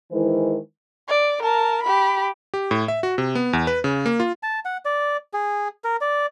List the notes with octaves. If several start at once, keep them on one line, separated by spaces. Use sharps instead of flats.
D#3 E3 G#3 E4 A#4 C5
D5
A#4 A5
G4 B5
G4
A2
E5
F#4
C3
B3
E2
B4
C#3
A#3
F4
A5
F#5
D5
G#4
A#4
D5